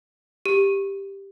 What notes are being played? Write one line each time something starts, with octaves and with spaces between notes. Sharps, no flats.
G4